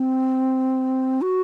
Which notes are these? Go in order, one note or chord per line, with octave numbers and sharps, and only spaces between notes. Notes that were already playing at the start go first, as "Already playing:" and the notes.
Already playing: C4
F#4